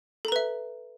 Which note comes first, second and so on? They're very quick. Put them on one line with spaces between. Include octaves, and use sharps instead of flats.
A4 A#5 B4 E5